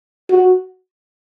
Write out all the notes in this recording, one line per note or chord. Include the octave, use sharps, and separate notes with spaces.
F#4